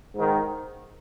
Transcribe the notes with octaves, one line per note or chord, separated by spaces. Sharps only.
G#2
D#3